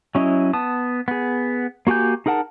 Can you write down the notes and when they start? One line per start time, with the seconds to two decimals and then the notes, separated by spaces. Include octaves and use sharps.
0.15 F#3 C#4 E4 D#5
0.53 B3 A5 D#6
1.08 B3 G#4
1.87 A#3 F#4 G4 G#5 G6
2.26 D#4 G#4 A#4 F#5 A5